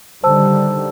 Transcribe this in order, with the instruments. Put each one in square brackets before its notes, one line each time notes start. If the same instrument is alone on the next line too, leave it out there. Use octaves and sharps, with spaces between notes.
[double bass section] D3 D#3 G3 [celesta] C5 A5 E6